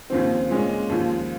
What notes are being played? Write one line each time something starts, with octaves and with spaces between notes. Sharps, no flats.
D#2 C#3 F3 C4
A#2 G#3 C#4
D#2 C#3 F3